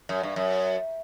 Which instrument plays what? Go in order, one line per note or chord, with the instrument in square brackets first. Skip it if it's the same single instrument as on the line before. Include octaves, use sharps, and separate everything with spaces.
[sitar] F#2
G2
F#2